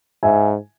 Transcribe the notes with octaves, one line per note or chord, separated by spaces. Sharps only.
G#2 E5 G#5